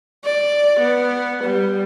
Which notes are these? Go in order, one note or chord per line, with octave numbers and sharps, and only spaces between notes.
D5
B3
G3